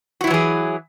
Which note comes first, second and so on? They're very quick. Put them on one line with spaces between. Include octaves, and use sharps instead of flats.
F#4 E4 F#3 E3 G#4